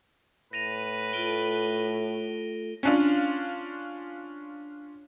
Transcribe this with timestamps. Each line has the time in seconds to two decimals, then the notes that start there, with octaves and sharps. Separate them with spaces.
0.53 A2 B4 A#6 D#7 F7
1.13 A3 F4 A4 D7 G7
2.83 C#4 D4 F4